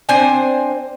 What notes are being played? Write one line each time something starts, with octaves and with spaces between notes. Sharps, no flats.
C4 D4 C5 G#5